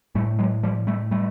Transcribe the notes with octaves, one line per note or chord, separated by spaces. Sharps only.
A2 G3 A3
F#3 G#3
F3 G3
G3 A3
G3 A3